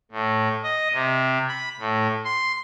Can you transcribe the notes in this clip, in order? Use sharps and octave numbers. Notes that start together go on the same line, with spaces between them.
A2
D#5
C3
B5
A2
C6